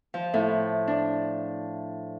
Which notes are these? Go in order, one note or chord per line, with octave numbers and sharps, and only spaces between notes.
F3
A2
D4